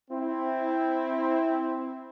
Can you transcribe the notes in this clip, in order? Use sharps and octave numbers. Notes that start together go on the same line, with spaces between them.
C4 E4